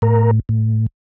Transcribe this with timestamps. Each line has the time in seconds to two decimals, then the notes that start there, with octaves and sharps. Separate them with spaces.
0.02 A2 A#4
0.49 A2